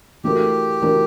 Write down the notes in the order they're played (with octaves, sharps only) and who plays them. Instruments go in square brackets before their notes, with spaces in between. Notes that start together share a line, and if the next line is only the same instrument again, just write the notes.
[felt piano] E3 A3 D4 F#4 A#4 [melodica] G4
[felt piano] E3 A3 D4 F#4 A#4